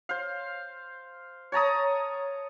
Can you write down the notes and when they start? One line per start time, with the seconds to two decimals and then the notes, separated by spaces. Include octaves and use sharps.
0.09 C5 F5
1.52 C#5 A5 A#5 D#6